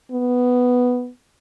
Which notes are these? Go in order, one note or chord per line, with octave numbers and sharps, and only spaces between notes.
B3